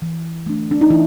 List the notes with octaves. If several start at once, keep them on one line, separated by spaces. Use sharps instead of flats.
E3
A3 D4
D4
D#4
E3 E4